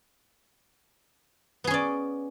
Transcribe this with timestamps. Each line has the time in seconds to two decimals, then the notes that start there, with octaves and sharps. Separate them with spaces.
1.64 B3
1.67 G#4
1.71 C#4
1.74 D5